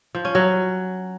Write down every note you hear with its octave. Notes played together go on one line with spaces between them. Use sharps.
F3
C#4
F#3